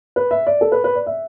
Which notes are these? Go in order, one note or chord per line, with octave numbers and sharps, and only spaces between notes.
B4
E5
D5
A4
B4
B4
D5
E5